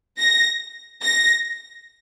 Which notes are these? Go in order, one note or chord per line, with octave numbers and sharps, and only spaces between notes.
A#6
A#6